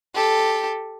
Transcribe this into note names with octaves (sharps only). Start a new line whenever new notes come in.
G4 A4